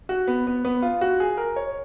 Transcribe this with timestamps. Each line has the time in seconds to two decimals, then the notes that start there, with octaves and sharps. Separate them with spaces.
0.09 F#4
0.27 B3
0.47 B3
0.65 B3
0.82 F4
1.01 F#4
1.20 G#4
1.37 A#4
1.56 C#5